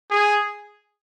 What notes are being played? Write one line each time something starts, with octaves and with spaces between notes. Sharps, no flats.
G#4